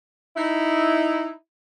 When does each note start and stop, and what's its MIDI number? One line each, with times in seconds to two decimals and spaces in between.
0.37 1.30 63
0.37 1.30 64